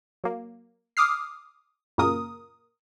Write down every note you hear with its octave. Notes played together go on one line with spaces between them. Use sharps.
F#3 A#3
D6 D#6 F6 C7
F#2 A#2 C#3 A#3 A#4 D#6